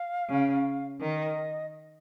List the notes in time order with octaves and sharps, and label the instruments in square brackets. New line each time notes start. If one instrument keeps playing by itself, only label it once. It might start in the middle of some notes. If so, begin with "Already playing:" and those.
Already playing: [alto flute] F5
[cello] C#3
[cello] D#3 [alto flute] D#5